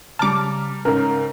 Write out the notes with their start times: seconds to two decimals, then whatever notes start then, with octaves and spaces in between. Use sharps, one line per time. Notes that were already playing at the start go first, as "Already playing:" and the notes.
0.19 C#3 G3 A5 A#5 D6 F6
0.85 G#2 C#3 C#4 A#4